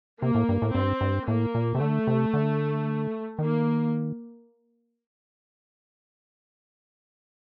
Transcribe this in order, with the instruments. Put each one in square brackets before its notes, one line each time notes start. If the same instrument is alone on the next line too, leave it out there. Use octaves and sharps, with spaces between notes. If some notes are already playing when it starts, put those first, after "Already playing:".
[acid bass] C3 [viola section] A#3
[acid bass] A2
G2
A2
[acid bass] G2 [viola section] C4
[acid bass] G2
[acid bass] A2 [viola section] A#3
[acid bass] A#2
C3
[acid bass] D3 [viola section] A3
[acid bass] C3
D3
[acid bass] D#3 [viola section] A#3